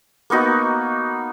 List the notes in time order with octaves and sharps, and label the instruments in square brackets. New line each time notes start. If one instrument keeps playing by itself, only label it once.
[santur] A#3 B3 D#4 F#4